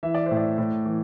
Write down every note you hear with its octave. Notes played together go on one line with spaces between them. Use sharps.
E3 E5
D5
A2 C5
D5
A2
E3